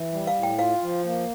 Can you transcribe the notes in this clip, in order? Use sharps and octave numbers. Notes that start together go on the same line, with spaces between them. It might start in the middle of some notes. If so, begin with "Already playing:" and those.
Already playing: E3
G3
F5
A2
G5
F4 F5
F3
A#3